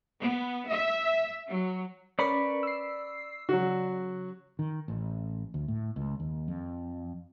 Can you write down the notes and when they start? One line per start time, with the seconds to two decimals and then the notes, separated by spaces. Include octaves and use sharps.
0.22 B3
0.72 E5
1.48 F#3
2.19 C#4 A#4 B4 D5 B5 C#6
2.63 E6 C7
3.49 C#3 F#3 F#4
4.59 D#3
4.88 A1
5.54 D2
5.68 A2
5.96 C#2
6.20 D#2
6.48 F2